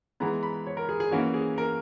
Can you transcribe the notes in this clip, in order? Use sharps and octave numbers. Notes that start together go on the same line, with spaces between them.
E3 G#3 B3 A#5
B5
C#5
A#4
G#4
G#4
E3 A#3 C#4 F#4
G#4
A#4